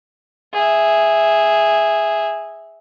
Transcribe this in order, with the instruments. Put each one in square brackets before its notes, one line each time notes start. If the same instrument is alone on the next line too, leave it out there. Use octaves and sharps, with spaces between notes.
[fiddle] G#4 E5